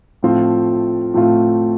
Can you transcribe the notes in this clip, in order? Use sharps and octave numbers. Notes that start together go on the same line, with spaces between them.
A2 F3 A3 C4 F4
A2 F3 A3 C4 F4